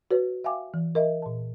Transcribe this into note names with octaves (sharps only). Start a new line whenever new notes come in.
F#4 B4 C#5
E5 F5 G5 G#5 D6
E3
A#4 D#5 E5
A#2 A5